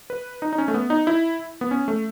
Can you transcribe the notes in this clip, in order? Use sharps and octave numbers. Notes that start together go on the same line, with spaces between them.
B4
D#4
D#4
C#4
A3
B3
D#4
E4
B3
C#4
A3